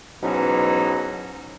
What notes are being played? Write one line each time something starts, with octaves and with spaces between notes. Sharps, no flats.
G#2 B2 E3 F#3 C#4 D#4